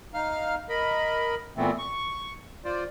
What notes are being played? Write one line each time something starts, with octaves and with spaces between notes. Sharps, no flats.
D#4 F5 F6
A#4 D#5 B5
A#2 E3 A3 B3 C4
C#6
F4 C5 D5